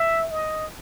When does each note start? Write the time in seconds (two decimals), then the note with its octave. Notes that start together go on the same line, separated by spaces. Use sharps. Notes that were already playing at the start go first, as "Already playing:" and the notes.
Already playing: E5
0.31 D#5